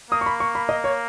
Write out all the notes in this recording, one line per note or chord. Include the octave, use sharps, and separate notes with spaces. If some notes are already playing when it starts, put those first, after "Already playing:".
A#3 D#6
C#6
B5
C#6
B5
D#5
C#5